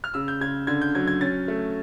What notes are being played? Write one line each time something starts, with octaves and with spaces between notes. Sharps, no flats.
F6
C#3 E6
G6
C#3 G#6
D3 G#6
G6
F#3 G#6
G#6
C#4 A6
A3